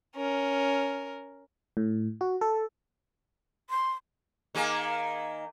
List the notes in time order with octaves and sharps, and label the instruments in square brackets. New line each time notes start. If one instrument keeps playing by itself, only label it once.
[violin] C#4 A#4
[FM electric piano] A2
F#4
A4
[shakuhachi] C6
[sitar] D#3 A#3 G#4